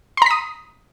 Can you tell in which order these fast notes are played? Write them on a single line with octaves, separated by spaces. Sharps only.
C6 A#5 B6 D#6